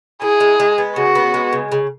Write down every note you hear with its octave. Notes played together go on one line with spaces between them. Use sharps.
E4 G#4
G#3
G#3
B3
C#3 F#4
B3
G#3
C#3
C#3